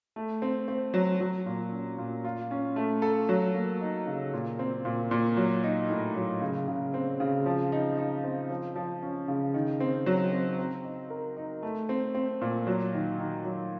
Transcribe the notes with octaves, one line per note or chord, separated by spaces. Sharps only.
A3
C4
C4
F#3
F#3
A#2
C#4
A#2
F4
C#4
A3
A4
F#3
A#3
D#4
C#3
A#2
C4
A#2
A#2
F#3
D#4
A2
F#3
C#3
C#3
C4
C#3
F3
D#4
D#4
C4
F3
F3
C#4
C#3
D#3
C4
F#3
C4
C4
D#4
A#4
D#4
A3
C4
C4
A#2
F#3
D#3
D#3
F#3